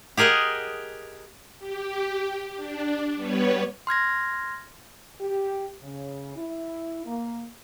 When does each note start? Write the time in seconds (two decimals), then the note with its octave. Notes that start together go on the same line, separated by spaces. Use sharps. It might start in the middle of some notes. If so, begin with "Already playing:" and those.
0.17 G4 G#4 A#4 D#5 F#5
1.59 G4
2.55 D4
3.15 G3 B3 B4 C#5
3.87 C6 F6 G#6 A#6
5.21 G4
5.83 C#3
6.36 E4
7.06 A#3